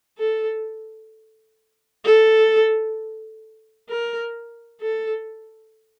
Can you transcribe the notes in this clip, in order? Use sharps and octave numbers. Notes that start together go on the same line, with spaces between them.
A4
A4
A#4
A4